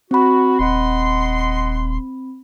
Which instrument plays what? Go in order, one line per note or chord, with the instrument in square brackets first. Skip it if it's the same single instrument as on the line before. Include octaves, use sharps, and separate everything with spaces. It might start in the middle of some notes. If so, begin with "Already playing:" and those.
[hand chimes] C4 B5 [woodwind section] F#4
[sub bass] D#1 [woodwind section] D#5 F#5 C6